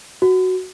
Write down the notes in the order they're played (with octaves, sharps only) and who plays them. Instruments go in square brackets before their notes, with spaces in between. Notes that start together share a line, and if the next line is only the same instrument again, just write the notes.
[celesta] F#4